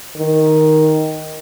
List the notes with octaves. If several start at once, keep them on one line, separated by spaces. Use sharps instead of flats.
D#3